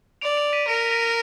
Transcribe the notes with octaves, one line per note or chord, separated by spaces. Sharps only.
D5 D7 F7
D7 F7
B6 D#7
A#4 A#6 D7
A#6 D7